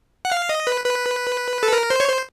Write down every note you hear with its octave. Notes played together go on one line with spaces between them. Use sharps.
F#5
F5
D#5
B4
B4
A4
A#4
C5
C#5
C5